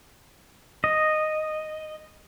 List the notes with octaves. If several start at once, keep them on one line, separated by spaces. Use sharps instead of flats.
D#5